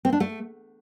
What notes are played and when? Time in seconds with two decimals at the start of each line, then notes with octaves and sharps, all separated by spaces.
0.05 C4
0.13 D4
0.20 A3